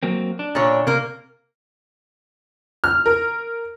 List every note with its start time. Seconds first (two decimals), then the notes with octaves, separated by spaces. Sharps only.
0.03 F#3 A#3 C4
0.39 D4
0.55 A#2 D3 C#5
0.87 C3 A#3 A#4
2.84 F6
3.06 A#4